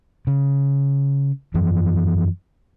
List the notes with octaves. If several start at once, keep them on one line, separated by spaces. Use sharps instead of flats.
C#3
F#2 E3 F3